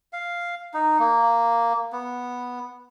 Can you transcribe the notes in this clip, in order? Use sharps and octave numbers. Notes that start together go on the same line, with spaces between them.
F5
D#4
A#3
B3